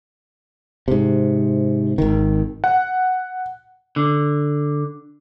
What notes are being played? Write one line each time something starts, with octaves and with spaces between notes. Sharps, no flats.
G#2 C3
G#1 D#3
F#5
D3